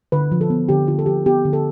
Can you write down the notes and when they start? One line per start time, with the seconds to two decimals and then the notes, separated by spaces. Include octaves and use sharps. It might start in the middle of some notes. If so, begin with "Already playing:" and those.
0.12 D3 B4
0.32 F3
0.41 A4
0.50 B3
0.69 D3 G4
0.87 D3 F4
0.99 A4
1.06 F3 G4
1.26 B3 G4
1.45 D3
1.53 A4